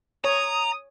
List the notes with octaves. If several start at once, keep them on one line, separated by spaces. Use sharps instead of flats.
C#5 A#5 D#6